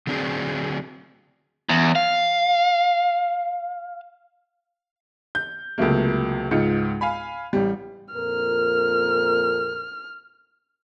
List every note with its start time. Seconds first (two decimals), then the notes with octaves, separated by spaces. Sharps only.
0.07 D3 F#3 C4 D4 G#4
1.69 E2
1.96 F5
5.35 G6
5.78 C#2 C3 F#3 A3 A#3
6.51 C#2 G#2 D#4 F4 C#7
7.01 F5 G#5 B5
7.53 A1 G3
8.14 F2 A#2 A#4 F6